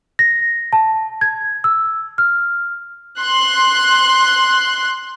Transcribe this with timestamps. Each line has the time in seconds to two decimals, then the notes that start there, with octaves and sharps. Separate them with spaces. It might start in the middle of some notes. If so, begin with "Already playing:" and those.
0.19 A#6
0.73 A5
1.21 G#6
1.64 E6
2.18 F6
3.18 C6 F#6